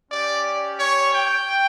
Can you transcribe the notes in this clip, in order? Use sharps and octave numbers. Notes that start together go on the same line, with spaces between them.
C#4 G4 D5
C#5
G5